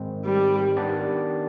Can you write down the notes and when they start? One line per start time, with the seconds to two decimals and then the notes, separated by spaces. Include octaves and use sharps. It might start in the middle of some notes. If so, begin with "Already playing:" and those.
Already playing: G#2 D#3 G#3 C4
0.25 G3
0.77 D#3 B3 D4 G4 D5